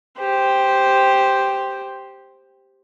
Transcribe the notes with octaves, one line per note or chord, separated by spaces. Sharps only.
G4 C5